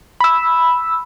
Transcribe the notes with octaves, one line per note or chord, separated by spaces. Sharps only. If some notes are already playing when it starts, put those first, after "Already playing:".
B5 E6